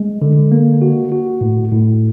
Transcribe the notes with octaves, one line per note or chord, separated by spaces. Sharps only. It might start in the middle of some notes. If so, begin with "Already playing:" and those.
Already playing: G#3
D3
A#3
F#4
F#4
A2
A2